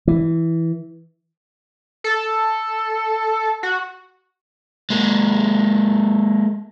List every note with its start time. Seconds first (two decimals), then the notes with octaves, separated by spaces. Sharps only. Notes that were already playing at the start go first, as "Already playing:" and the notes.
0.07 E3
2.04 A4
3.63 F#4
4.90 G#3 A#3